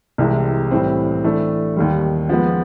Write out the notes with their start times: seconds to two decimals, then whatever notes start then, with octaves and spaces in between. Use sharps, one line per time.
0.18 C2 C3 E3 G#3
0.71 A2 E3 G3 C4
1.24 E3 A3 D4
1.76 D#2 D#3 G3
2.29 F3 G#3 B3